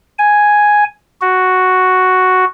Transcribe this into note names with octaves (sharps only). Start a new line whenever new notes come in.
G#5
F#4